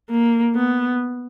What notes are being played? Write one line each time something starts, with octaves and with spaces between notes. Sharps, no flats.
A#3
B3